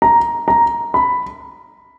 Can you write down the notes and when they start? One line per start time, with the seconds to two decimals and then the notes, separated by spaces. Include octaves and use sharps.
0.02 A#5
0.48 A#5
0.94 B5